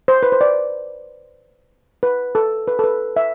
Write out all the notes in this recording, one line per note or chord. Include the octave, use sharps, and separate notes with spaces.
C5
B4
C5
D5
B4
A4
B4
A4
B4
E5